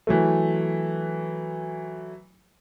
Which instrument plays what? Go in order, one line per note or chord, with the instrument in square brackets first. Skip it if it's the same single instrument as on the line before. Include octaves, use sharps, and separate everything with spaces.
[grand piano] E3 F#3 A3